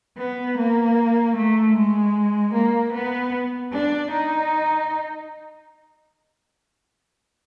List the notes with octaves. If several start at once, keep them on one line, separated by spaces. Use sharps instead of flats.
B3
A#3
A3
G#3
A#3
B3
D4
D#4